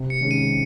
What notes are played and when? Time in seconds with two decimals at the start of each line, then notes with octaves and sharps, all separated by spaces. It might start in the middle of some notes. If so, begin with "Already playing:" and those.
Already playing: C3
0.10 C#7
0.21 D#3 G#3 C#4
0.31 D#7